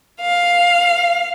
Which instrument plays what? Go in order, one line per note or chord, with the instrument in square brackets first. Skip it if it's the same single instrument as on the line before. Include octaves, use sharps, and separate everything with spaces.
[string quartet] F5